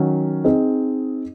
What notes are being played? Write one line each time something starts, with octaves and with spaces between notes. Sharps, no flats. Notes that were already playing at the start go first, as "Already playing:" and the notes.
Already playing: D#3 F#3 C#4 F#4
C4 D#4 G#4 D#5